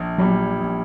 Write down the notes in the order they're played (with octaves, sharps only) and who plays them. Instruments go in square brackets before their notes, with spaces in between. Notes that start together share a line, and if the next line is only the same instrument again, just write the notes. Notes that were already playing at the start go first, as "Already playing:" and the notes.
Already playing: [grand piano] A#1
[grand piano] A#2 G3 [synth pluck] F#3
[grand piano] A#1